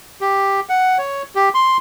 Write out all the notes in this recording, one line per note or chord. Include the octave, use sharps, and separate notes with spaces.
G4
F#5
C#5
G4
C6